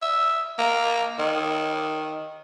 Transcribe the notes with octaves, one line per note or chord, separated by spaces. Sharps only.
E5
A#3
D#3